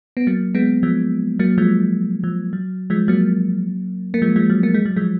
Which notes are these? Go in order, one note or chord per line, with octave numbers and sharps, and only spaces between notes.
B3
F#3 A#3
G#3 B3
F3 G#3
F#3 A#3
F3 G#3
F3
F#3
F3 G#3
F#3 A#3
A#3
F3 G#3
F3 G#3
F#3
A#3
G#3
F#3
F3 G#3